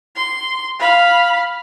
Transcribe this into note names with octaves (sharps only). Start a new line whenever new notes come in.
C6
F5 B5